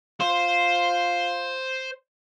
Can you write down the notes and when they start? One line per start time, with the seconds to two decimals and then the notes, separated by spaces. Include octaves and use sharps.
0.20 F4 C5